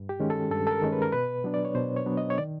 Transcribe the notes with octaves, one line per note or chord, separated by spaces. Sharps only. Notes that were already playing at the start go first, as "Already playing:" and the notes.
Already playing: G2
G4
D#3 G#3 C#4
A4
G2 A4
A4
A#4
D#3 G#3 C#4
B4
A#4
B2 B4
F#3 B3 D4
D5
C#5
B2 C5
C#5
F#3 B3 D4
D#5
C#5
D#3 D5